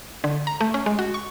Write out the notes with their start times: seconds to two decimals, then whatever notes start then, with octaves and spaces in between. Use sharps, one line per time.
0.24 D3
0.47 A#5
0.61 A3
0.74 C#4
0.86 G#3
0.99 F#4
1.14 C#6